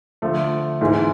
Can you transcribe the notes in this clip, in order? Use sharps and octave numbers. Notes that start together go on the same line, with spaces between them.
D3 F3 A3
G#2 E3 G#3 C4 E4